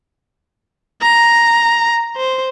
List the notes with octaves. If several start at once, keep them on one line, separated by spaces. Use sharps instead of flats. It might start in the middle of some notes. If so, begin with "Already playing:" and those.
A#5
C5